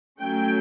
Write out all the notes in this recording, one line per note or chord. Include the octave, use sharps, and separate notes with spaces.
F#3 A3 C#4 G5